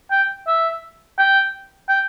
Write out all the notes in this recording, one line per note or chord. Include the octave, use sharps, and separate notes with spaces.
G5
E5
G5
G5